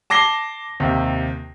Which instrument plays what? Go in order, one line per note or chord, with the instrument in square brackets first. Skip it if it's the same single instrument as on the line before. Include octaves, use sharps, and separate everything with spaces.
[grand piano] A5 D6 A#6 C7 G7
D#2 C3